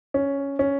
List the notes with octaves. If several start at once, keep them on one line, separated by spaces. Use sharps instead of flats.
C#4
C#4